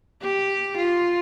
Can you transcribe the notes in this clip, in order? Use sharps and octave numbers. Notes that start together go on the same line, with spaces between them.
G4
F4